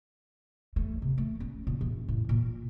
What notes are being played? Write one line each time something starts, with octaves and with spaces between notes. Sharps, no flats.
A3
C3
A3
C#4
A#2
F#2
A2
A#2